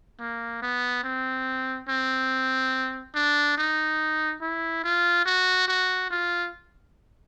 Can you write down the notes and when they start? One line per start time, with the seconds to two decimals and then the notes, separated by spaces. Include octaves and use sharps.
0.20 A#3
0.62 B3
1.04 C4
1.89 C4
3.15 D4
3.58 D#4
4.42 E4
4.84 F4
5.26 F#4
5.68 F#4
6.10 F4